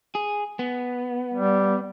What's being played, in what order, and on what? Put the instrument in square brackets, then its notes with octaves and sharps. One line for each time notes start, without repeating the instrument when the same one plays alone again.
[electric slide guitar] G#4
B3
[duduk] G3